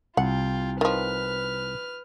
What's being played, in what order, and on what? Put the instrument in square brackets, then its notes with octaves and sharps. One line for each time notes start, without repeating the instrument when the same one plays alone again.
[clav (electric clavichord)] C2 [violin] F4 G5 [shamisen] F#5
[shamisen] D#3 F3 [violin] B4 F6